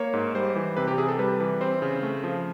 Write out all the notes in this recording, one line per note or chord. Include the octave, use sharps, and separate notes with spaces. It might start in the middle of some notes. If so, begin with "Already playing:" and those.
Already playing: A#3 C#5
G#2
G3 C5
E3
C3 B4
G4
C3 G#4
A4
G3 B4
E3
C4 C5
C#3
A3
F3